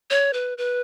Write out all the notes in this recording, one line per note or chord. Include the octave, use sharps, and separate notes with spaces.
C#5
B4
B4